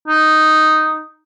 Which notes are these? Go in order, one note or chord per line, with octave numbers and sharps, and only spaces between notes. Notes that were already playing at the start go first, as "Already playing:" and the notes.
D#4